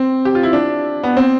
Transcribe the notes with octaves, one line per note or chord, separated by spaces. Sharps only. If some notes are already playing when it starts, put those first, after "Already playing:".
Already playing: C4
G4
F4
E4
D4
B3
C4